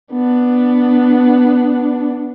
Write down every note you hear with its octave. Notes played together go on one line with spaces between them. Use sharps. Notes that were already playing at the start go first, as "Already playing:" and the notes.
B3 D4